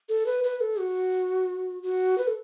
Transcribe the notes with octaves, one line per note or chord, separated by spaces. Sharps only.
A4
B4
B4
A4
F#4
F#4
B4
A4